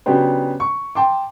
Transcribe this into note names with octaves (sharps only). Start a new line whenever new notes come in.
C#3 F#3 B3 D4 G4 C5
C#6
G5 A5 C6 D6